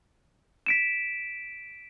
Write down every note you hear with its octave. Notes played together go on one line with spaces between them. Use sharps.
B6 D7 E7